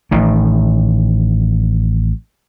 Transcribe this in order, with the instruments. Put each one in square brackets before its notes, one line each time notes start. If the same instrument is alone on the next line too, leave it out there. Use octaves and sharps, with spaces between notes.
[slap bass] A1 A2 D#3